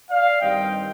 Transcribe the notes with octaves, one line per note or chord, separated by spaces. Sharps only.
D5 F5
G2 D#3 G3 C4 D#5 G5